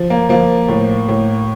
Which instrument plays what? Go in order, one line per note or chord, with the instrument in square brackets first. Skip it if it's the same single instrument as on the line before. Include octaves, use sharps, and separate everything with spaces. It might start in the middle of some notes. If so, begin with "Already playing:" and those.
Already playing: [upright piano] F3
A#3
F3 A#3
A2
A2